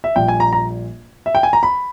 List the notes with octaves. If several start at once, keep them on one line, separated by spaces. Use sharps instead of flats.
E5
A#1 A#2 G3 G5
G#5
A#5
A#5
E5
G5
G#5
A#5
B5